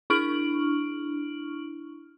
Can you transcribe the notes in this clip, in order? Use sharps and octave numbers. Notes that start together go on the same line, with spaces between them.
D4 E4 C#6 F6 D7 F#7